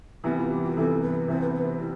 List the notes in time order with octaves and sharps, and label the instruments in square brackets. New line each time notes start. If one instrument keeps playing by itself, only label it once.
[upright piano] C3 E3 G3 B3 [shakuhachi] B4
[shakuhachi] F4
G4
G4
B4
[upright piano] C3 E3 G3 B3 [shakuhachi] A4
[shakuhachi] B4
[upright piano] C3 E3 G3 B3 [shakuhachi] C5
[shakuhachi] B4
C5
B4
[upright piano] G3 B3 [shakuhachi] E4